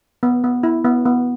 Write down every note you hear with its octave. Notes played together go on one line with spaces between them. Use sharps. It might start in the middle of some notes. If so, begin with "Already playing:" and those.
B3
B3
E4
B3
B3